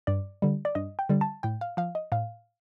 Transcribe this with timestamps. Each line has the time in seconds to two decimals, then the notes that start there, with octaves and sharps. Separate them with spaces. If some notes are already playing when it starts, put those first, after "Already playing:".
0.07 G2 D5
0.42 D3 G3
0.65 D5
0.75 G2 D#5
0.99 G5
1.09 D3 G3
1.21 A5
1.43 A2 G5
1.61 F5
1.77 F3 F5
1.95 D#5
2.12 A2 F5